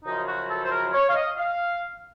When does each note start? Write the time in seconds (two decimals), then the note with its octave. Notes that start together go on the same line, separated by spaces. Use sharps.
0.05 F#2 C#3 F3 D#4
0.27 F#4
0.49 A4
0.64 C5
0.71 A#4
0.93 C#5
1.08 F5
1.14 D#5
1.36 F5